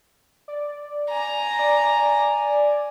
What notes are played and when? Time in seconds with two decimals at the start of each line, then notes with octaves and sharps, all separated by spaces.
0.48 D5
1.11 G#5 A#5
1.59 D5